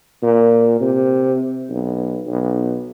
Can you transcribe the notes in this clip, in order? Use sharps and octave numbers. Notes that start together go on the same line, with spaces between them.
A#2
C3
B1
B1